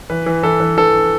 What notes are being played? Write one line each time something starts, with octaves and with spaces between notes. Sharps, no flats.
E3 B4
E3
E3 A4
E3
E3 A4